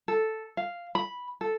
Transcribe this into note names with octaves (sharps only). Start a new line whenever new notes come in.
A4
F5
B5
A4